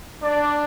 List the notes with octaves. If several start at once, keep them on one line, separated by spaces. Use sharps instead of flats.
D4 D5